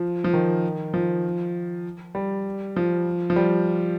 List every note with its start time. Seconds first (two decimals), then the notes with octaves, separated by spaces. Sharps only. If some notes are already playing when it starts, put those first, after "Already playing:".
Already playing: F3
0.24 F3
0.33 D#3
0.94 F3
2.15 G3
2.76 F3
3.30 F3
3.36 G3